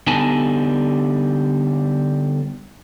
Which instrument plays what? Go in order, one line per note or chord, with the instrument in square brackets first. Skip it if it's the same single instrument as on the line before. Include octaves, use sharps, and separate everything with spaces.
[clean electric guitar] D3 G3 B3 D#4 G#5 A5